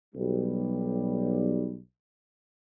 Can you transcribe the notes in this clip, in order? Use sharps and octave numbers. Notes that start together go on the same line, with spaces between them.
B1 G3